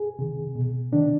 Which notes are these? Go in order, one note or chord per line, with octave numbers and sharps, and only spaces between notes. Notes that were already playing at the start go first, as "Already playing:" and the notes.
Already playing: G#4
C3 D#3
B2
C3 D#3 D4